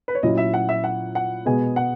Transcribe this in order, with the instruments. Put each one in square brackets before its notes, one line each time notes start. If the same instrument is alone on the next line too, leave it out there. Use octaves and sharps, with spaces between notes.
[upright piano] B4
C#5
[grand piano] A#2 F#3 C#4 E4 [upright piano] D#5
[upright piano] E5
F#5
E5
F#5
F#5
[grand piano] B2 G#3 B3 [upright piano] G#5
[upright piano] F#5